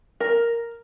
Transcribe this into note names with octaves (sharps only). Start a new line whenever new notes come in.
A#4